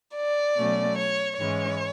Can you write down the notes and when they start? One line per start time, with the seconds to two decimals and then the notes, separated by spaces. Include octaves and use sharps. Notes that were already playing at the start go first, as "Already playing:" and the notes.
0.15 D5
0.56 B2 F#3 A3 C#4
0.98 C#5
1.38 G#2 E3 G#3 C#4 C#5